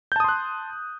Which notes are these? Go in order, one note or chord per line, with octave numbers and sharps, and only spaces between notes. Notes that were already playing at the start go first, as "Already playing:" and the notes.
A5 C6 D#6 F#6 G6